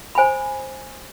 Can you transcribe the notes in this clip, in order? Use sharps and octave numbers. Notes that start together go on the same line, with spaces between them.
C5 G#5 B5